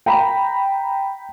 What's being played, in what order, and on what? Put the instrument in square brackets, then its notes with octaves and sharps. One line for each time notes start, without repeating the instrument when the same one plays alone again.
[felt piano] G5 A#5 B5